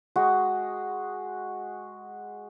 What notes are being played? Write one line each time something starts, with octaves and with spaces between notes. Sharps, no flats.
G#3 F#4 D#5